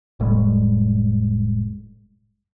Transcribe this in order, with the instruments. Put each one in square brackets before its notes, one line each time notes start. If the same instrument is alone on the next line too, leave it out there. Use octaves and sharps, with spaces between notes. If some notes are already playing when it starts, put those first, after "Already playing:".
[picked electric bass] F1 A2 G3 G#3